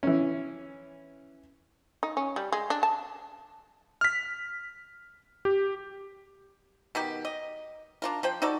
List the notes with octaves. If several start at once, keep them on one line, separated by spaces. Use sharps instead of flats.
E3 C#4
D#4
C#4
G3
G#3
D4
A5
F6 B6
G4
B2 D#3 G4
D#5
D4 F4 A#4
F3 C5 G5
D#4 F#4 A4 D5